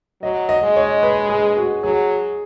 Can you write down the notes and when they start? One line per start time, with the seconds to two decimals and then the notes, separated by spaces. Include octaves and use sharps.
0.22 F#3 D#5
0.49 D#5
0.63 G#3
0.76 C#5
1.03 B4
1.30 G#4
1.57 F#4
1.83 F#3 G#4